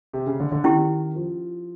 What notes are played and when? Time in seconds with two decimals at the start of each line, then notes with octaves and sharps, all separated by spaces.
0.13 C3
0.26 C#3
0.40 D3
0.52 D3
0.64 D#3 C#4 E4 G4
1.16 F3